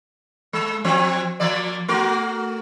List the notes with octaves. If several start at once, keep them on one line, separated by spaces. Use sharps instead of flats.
G#3
F3 C4
F3 A#3 D5
A3 F#4 A#4